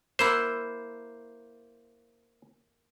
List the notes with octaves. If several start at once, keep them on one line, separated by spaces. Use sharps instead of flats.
A#3 E4 C5 F#5